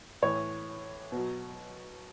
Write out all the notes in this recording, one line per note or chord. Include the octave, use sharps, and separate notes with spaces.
A2 E3 C#5
B2 F#3